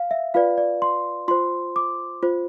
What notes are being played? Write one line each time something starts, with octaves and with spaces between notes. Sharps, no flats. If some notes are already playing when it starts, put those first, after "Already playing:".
Already playing: F5
E5
F4 B4 D5 F5
D5
C6
F4 C5 C6
D6
F4 C5